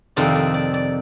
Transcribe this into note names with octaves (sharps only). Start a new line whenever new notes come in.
F2 C3 D#3 D5
D5
D5
D5